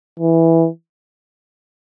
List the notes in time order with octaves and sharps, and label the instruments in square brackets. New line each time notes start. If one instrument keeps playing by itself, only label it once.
[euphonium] E3